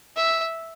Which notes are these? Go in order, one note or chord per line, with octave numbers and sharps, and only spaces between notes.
E5